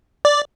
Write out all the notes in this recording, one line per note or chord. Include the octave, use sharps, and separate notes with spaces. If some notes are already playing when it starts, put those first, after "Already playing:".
D5